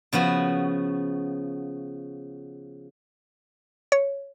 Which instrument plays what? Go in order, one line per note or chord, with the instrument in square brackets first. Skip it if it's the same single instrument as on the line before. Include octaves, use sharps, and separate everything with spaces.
[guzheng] C#3 F3 B3 F#4
[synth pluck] C#5